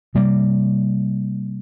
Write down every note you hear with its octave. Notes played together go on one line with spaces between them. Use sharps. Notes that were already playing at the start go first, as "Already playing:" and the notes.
C3 G3 A#3